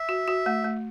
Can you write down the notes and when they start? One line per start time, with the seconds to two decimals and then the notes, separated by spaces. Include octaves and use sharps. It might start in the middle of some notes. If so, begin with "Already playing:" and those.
Already playing: E5
0.09 F#4
0.28 F#4
0.46 A3
0.64 A3